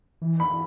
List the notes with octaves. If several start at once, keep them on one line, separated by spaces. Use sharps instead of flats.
E3
B5
E3